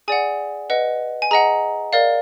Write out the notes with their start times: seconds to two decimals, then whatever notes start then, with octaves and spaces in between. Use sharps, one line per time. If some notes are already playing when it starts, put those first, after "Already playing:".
0.08 G#4 D5 F#5 G#5
0.70 B4 D#5 F#5
1.22 G#5
1.31 G#4 D#5 F#5 A#5
1.93 A#4 D5 F5